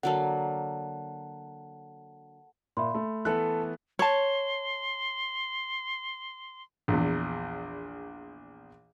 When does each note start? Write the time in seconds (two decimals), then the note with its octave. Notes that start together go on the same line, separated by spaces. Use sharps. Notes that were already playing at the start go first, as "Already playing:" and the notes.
0.03 D3 F#3 A#3 F#5 A5
2.77 A#2 E5 B5 C6
2.95 A3
3.25 E3 A3 B3 A4 F#6
3.99 C#5 A5 C6
6.88 A#1 E2